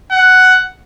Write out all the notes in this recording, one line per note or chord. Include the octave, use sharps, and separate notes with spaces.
F#5